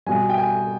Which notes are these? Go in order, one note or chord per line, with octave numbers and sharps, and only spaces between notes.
B2 G3 G#5
G5
G#5